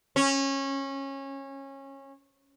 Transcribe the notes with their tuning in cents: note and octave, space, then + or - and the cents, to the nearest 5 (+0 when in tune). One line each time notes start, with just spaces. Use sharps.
C#4 -20